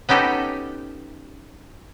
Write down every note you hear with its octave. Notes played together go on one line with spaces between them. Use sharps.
B3 C#4 D#4 G4 A4